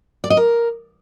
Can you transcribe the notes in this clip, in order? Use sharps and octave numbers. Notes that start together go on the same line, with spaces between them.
D5
D#5
A#4